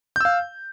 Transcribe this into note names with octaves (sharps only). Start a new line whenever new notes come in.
F5 E6 G6